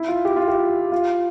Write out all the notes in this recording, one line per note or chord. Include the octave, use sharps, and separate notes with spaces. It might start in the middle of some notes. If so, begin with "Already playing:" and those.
Already playing: E4
F4
G4
F4
G4
F4